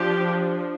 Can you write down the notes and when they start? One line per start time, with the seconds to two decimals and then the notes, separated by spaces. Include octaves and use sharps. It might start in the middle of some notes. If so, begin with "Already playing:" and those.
Already playing: F3 D4 G4